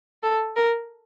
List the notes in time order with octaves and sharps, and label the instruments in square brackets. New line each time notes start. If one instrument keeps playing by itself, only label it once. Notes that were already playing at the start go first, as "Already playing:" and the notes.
[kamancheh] A4
A#4